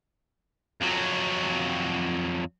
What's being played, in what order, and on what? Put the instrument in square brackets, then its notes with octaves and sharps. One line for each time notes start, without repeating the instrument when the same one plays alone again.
[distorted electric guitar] F2 F#3